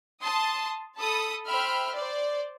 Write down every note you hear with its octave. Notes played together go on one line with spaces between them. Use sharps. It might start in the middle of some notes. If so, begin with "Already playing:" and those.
A5 C6 D#6
A4 A5 B5 D#6
C5 E5 G5 B5 F6
C5 D5